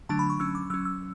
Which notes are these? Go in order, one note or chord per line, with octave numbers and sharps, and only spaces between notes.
D3 F#3 A3 D4 A5
B5
C#6
F#3 C#4 E6
D6
F#3 C#4 E6
E6